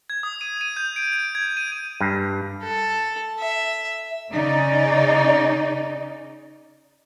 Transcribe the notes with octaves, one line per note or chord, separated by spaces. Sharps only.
G#6
D#6
D#7
D#7
G6
D7
D7
G#6
D#7
G2
A4
E5
C#3 D#4 D5